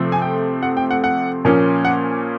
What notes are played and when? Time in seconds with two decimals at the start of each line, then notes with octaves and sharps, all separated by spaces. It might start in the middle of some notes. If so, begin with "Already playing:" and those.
Already playing: C3 F3 A3 C4
0.12 G#5
0.22 G5
0.63 F#5
0.77 G5
0.91 F#5
1.04 F#5
1.45 A#2 F3 A#3 C#4
1.85 F#5